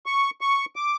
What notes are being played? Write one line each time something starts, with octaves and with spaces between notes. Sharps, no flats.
C#6
C#6
D6